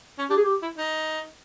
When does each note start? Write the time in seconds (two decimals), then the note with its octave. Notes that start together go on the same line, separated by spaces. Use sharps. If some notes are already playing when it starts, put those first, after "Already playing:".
0.18 C#4
0.30 D4 G4
0.37 G#4
0.44 G4
0.62 E4
0.77 D#4